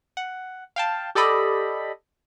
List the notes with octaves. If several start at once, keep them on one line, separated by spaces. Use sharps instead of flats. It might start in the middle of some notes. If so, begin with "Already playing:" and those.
F#5
F5 G5 A5
G4 A4 D5 D#5 B5